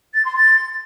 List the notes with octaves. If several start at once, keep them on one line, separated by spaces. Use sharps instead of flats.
A6
C6
A6